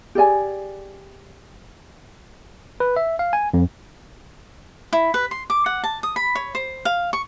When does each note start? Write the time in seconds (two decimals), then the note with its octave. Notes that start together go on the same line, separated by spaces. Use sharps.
0.15 G4 G#4 D5 G#5
2.80 B4
2.96 E5
3.19 F5
3.33 G#5
3.54 F2
4.93 E4
5.14 B4
5.31 C6
5.50 D6
5.66 F#5
5.84 A5
6.03 D#6
6.16 B5
6.35 C#5
6.55 C5
6.85 F5
7.13 C#6